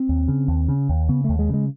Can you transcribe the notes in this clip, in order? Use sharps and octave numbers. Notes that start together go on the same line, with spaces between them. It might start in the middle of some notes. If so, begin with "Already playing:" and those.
Already playing: C4
D#2
C#3
D#2
C#3
D#2
C#3 B3
D#2 A3
G#3
C#3 G#3